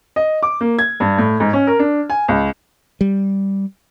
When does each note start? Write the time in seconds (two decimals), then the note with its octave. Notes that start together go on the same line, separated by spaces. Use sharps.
0.16 D#5
0.43 D6
0.61 A#3
0.79 G#6
1.00 G2
1.18 A2
1.40 G#2
1.53 C#4
1.67 A#4
1.79 D4
2.10 G#5
2.28 C#2
3.01 G3